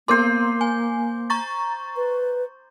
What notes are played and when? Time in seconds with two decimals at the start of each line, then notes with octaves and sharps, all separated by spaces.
0.08 A#3 B3 A#4 C5 C6 D6
0.61 G#5
1.30 A#5 C#6 A6
1.96 B4